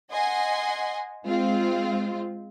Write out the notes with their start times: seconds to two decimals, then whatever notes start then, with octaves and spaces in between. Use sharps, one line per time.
0.11 D#5 F#5 G#5 C6
1.24 G#3 C4 F4